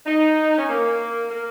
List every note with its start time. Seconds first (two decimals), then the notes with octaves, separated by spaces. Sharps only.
0.06 D#4
0.58 C#4
0.68 A#3
1.30 A#3